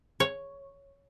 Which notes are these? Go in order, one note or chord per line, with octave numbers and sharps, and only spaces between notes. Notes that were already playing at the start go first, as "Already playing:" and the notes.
C#5